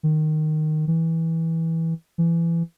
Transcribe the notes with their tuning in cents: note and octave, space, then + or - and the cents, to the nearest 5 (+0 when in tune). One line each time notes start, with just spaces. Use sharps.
D#3 -10
E3 -15
E3 +25